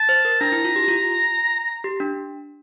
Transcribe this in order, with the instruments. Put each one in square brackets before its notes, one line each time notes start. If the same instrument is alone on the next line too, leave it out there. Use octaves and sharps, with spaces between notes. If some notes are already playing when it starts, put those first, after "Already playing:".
Already playing: [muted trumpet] A5
[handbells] C5
A#4
[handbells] D4 [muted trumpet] A#5
[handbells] E4
F4
G4
F4
G4
D4